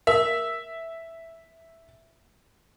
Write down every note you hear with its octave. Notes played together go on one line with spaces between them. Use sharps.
A#4 E5